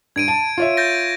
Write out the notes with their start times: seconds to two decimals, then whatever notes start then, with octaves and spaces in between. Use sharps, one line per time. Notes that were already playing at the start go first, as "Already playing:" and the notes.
0.16 G2 G#6 D7 D#7
0.28 A5
0.58 F4 C#5 E5
0.77 G6 A6 A#6